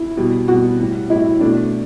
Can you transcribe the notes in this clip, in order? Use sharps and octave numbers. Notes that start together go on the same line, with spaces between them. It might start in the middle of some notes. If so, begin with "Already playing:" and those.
Already playing: E4
B2 G3
B2 G3 F#4
A2 G3
A2 G3 E4
B2 A3 D4